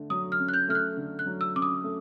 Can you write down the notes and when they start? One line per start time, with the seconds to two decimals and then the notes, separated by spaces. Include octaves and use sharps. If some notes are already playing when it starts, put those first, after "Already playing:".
Already playing: D3 A3
0.10 F#3 D#6
0.32 F6
0.39 C#4
0.49 F#6
0.54 G6
0.68 A3 F6
0.75 F#6
0.97 D3
1.19 F#6
1.26 F#3
1.41 E6
1.55 C#4 D6
1.62 D#6
1.84 A3